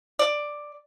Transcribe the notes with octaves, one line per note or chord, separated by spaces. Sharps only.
D5